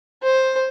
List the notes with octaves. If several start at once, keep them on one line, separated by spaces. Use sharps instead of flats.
C5